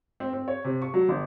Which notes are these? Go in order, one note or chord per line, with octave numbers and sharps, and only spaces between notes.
C4
C4
C#5
C3
C#6
F#3
G1